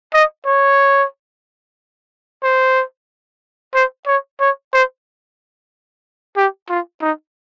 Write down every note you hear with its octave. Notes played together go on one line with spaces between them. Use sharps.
D#5
C#5
C5
C5
C#5
C#5
C5
G4
F4
D#4